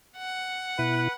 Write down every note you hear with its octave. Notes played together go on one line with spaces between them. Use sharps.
F#5
B2 E4 B4